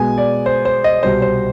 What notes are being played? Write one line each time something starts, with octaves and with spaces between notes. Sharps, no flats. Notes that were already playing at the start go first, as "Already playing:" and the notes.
Already playing: B2 G#3 B3 G#5
D5
C5
C5
D#5
C2 B2 G3 C5
C5